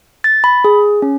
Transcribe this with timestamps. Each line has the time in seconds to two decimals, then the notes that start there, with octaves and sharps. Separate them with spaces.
0.24 A6
0.44 B5
0.64 G#4
1.02 C#4